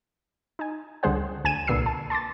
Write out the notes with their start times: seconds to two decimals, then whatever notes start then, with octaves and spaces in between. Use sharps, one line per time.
0.59 D#4 G#5
1.03 C#2 D3 G3 G#4 C5 F#5
1.44 D2 G#5 G#6 D#7 E7
1.67 C2 A#2 D3 B4 E6 C7
1.86 A5
2.10 A5 C6 D6 A6